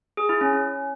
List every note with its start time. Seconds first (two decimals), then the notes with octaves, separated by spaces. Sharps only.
0.17 G#4
0.29 E4
0.41 C#4
0.53 C#4